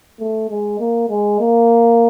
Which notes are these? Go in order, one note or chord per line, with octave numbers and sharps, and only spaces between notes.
A3
G#3
A#3
G#3
A#3